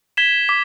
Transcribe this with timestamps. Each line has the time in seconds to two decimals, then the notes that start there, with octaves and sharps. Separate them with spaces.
0.17 G#6 B6 E7 G7
0.49 D6 B6